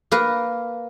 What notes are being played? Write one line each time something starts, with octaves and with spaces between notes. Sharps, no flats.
A#3 A#4 B4